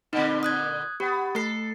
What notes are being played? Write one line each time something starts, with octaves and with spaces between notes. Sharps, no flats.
A#2 D3 C4 D#4
D#6 F#6 G#6
B3 G4
A3 A4 C7